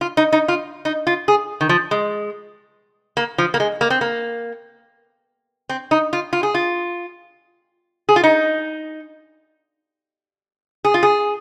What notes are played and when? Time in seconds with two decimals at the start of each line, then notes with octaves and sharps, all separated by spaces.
0.01 F4
0.17 D#4
0.32 D#4
0.48 F4
0.85 D#4
1.07 F4
1.28 G#4
1.61 D#3
1.69 F3
1.91 G#3
3.17 A#3
3.38 F3
3.54 A#3
3.60 G#3
3.81 A#3
3.90 C4
4.01 A#3
5.69 C4
5.91 D#4
6.13 F4
6.33 F4
6.43 G#4
6.54 F4
8.09 G#4
8.16 F4
8.24 D#4
10.85 G#4
10.94 F4
11.03 G#4